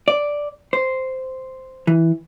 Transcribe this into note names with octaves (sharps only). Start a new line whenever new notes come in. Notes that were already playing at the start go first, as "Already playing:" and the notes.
D5
C5
E3